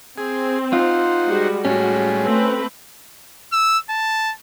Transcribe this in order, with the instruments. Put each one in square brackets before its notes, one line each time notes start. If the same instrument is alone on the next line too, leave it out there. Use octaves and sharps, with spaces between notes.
[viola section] C4 [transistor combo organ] G#4
[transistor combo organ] D#4 C5 F#5 [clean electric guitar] F4
[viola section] G3 G#3 F#4
[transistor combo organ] A2 G3 G#3 [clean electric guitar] C#4 [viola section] F#4
[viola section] A3 C4 B4
[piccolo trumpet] E6
A5